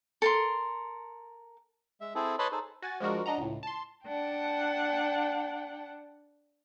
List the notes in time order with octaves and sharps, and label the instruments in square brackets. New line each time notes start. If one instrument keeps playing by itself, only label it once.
[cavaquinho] A4 A#4 C6
[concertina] G#3 E5
C4 E4 G#4 A4
B4 C#5 D#5 A5 B5 C6
D#4 G#4 A4 C5
[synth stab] F#4 G#5 A6
F3 G#3 D4 F#4 A#4
D4 D#5 F#5 A#5
C#2 A2
A5 C6
[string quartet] D4 F#5 G5 A5